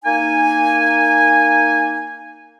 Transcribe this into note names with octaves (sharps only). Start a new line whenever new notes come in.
A#3 D#4 G#5